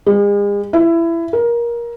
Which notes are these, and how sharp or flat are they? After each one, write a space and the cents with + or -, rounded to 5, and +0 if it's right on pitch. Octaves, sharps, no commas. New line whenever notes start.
G#3 -40
E4 +20
A#4 +20